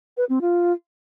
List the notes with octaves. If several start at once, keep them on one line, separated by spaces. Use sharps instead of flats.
B4
C4
F4